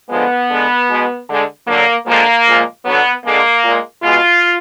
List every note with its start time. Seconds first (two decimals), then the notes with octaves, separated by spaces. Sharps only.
0.10 D3 F3 G#3 B3
0.50 D3 G#3
0.89 B2 G#3
1.28 D3 G#3
1.67 D3 F#3 A#3
2.06 D3 F3 G#3 A#3
2.47 A#2 F3 G#3
2.85 D3 F#3 B3
3.24 D3 G#3 A#3
3.64 A#2 G#3
4.03 B2 G#3 F4